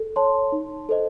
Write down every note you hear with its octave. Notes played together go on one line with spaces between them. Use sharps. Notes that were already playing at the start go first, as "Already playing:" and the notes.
Already playing: A4
C#5 A5 C6
D#4
A4 C5 D#5